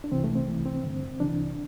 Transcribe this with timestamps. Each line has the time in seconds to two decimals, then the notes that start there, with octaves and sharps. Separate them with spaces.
0.04 D4
0.11 C2 C3 E3 C4
0.24 A3
0.35 C4
0.47 C2 C3 E3 A3
0.66 C4
0.84 G2 D3
1.20 C2 C3 E3 D4